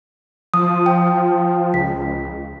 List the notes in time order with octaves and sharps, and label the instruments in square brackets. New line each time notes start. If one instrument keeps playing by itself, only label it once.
[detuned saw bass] F3 [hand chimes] D#6
[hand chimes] G5
[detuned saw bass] C#2 [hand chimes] B6